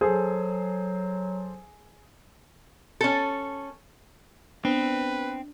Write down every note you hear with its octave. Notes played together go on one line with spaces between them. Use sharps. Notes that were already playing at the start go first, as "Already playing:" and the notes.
F#3 G#4 A4 C5
C#4 A4
B3 C4 D4 B4